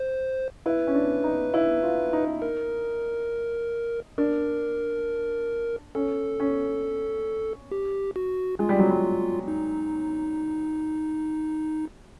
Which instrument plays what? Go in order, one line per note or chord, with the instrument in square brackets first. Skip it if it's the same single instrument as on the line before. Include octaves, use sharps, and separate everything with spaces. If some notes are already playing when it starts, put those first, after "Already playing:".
Already playing: [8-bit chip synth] C5
[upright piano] E4 [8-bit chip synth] B4
[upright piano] C#4
D4
D#4
E4
F4
D#4
[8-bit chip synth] A#4
[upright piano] D4 [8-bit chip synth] A#4
[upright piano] C#4 [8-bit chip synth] A4
[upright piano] C#4
[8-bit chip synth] G4
F#4
[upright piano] G#3 [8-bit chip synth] F4
[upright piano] G3
F#3
G3
[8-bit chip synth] D#4